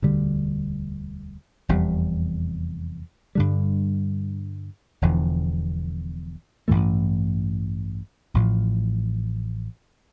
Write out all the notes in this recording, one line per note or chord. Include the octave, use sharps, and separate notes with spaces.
E1 D2 D3 G3
F1 E2 C3 G3
G2 D3 G3
E1 E2 D3 F3
A1 G2 E3 A3
A1 A2 F3